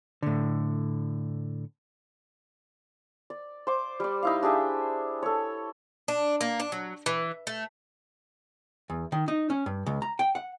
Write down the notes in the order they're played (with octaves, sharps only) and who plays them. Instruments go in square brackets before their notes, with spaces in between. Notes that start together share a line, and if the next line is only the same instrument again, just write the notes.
[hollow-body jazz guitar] A2 D3
[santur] D5
C5 D6
G3 D5
D#4 E4 F5
D4 G4 G#4 E5
A4 C#5
[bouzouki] D4
A#3
D4
F#3
E3
A3
[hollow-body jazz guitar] E2
D#3
D#4
C#4
G2
C#2
A#5
G5
F#5